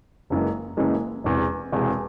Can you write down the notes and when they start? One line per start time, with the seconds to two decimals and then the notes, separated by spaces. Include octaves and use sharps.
0.30 F#1 F#2 C#3 E3 G#3
0.77 F#1 F#2 C#3 E3 G#3
1.24 E1 E2 C3
1.72 E1 E2 C3